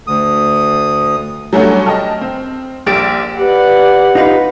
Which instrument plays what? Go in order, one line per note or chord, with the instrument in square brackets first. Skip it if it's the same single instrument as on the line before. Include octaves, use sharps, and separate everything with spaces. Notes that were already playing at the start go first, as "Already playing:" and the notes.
[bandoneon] D2 D#6
[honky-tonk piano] F#3 G3 A3 C#4 D4 F#4
D#5 G5 A5 F6
C4
A#1 G4 A6 D7 E7
[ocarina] G4 [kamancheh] B4 D5 [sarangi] F#5
[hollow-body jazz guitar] D#4 F4 B4